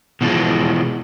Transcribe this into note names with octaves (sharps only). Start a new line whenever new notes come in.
B2 E3 F3 G#3